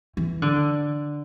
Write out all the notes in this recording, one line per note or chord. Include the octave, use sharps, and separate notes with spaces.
E3
D3